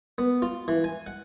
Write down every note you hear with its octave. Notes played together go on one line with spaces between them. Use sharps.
B3
F4
E3
G#5
F#5